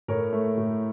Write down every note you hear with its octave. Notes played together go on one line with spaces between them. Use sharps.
A2 A#4 C#5
A3
A2